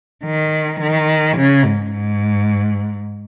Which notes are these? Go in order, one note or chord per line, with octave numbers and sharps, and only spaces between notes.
D#3
D#3
C#3
G#2
G#2